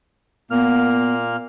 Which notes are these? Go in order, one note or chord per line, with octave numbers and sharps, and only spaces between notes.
A#2 A#3 B3 F6